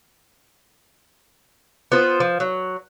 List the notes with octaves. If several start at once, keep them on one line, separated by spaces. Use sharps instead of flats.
B3 F4 C5
F3
F#3